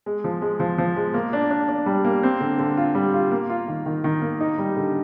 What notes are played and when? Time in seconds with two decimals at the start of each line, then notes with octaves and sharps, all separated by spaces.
0.06 G#3
0.24 F3
0.42 G#3
0.60 F3
0.78 F3
0.96 G#3
1.14 A#3
1.33 D4
1.51 D4
1.68 D4
1.86 G3
2.05 A#3
2.23 C4
2.41 D3
2.59 D3
2.77 F4
2.95 G3
3.14 F4
3.31 A#3
3.50 F4
3.68 D#3
3.86 D#3
4.04 D#3
4.22 A#3
4.40 D#4
4.58 G3
4.77 D3